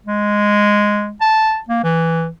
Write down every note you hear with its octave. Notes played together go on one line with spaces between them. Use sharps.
G#3
A5
A#3
E3